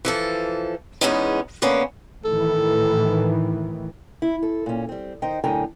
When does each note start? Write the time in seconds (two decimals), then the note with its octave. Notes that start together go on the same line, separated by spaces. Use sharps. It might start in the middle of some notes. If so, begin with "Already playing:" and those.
0.05 E3 F3 A4
1.01 E2 E3 G#3 B3 C#4 D#4
1.62 D3 A#3 B3 C#4
2.25 A2 D#3 E3 A4
4.22 E4
4.43 A4
4.66 A#2 C#4
4.89 G3 C4
5.22 D#3 D#4 C5 G5
5.44 F#2 A2 D3 G5 G#5 A#5